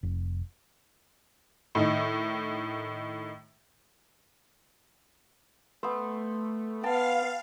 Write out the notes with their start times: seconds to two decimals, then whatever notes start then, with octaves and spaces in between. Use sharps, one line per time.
0.03 F1
1.75 A2 D#3 D#4
5.83 A3 B3 C5
6.83 B3 F5 G5 A5